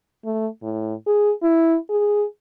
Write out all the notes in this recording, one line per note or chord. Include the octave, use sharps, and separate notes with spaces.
A3
A2
G#4
E4
G#4